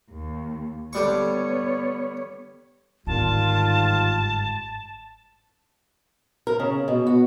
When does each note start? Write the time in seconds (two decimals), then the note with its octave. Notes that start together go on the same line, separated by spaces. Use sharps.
0.10 D#2
0.93 D3 G3 B3 C#5 C#6
3.07 G1 G#2 D#3 G3 F4 A5
6.47 A#4
6.60 C#3
6.88 B2
7.07 F#4